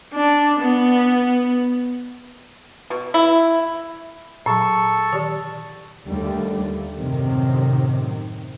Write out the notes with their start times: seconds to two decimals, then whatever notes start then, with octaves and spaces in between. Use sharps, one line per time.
0.15 D4
0.60 B3
2.90 B2
3.14 E4
4.46 A#2 F#3 A4 A5 C#6
5.13 D#3 G4 D5
6.06 D#2 D3 G3 A3
6.97 F#2 A2 C3 D#3 C4